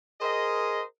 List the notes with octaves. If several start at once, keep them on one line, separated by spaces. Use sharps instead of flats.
G#4 A#4 C5 D#5